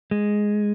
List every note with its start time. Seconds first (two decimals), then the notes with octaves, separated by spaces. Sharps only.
0.11 G#3